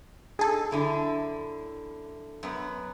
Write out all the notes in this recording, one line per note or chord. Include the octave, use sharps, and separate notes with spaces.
D#4 G#4 A4
F#2 D3 E4
F#2 B3